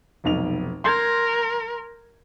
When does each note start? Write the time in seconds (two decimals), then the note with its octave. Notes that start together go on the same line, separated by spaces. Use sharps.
0.24 F1 B1 F7
0.84 A#4 C6 G6 G#6